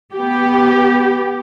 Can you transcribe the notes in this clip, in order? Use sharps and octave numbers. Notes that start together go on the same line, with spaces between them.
B3 G4